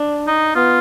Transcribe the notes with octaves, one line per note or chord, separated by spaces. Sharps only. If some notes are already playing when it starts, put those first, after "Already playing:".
Already playing: D4
D#4
B3 F4